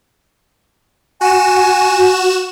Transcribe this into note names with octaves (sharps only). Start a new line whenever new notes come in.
F#4 G#5 E7